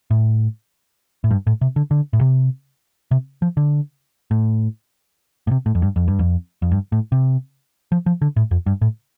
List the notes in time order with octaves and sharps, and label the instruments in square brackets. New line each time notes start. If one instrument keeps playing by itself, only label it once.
[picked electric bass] A2
A2
G2
A2
C3
D3
D3
A2
C3
C3
F3
D3
A2
A2
C3
A2
F2
G2
F2
G2
F2
F2
G2
A2
C3
F3
F3
D3
A2
F2
G2
A2